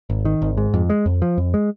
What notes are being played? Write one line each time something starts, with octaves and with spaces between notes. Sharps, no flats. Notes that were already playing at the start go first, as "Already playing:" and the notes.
G#1
D#3
G#1
G#2
F2
G#3
F2
F3
F2
G#3